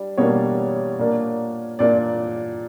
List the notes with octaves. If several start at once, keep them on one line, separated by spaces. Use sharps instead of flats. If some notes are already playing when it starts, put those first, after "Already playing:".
Already playing: G3 D4
B2 G3 A#3 D4 C#5
A#2 A#3 D4
A#2 A#3 D4 D5